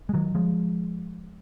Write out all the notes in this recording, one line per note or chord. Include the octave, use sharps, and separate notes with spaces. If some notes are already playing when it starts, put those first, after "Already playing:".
G#3
D#3 F#3
F3 G#3